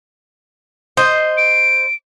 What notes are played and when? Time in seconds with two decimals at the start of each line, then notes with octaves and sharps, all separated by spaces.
0.97 C5 D#5
1.37 D7